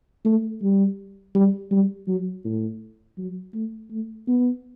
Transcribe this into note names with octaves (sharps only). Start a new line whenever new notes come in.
A3
G3
G3
G3
F#3
A2
F#3
A3
A3
B3